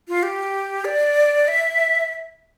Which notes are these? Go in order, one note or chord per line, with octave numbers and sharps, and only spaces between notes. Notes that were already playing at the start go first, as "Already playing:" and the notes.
F4
G4
D5
E5